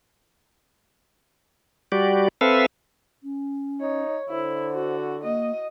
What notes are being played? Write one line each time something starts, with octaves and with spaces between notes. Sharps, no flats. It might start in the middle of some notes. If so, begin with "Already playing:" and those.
G3 F#4 G4 D5
C4 A4 B4 E5 F5
C#4
D#4 C#5
D3 E4 C5
F#4
A#3 D#5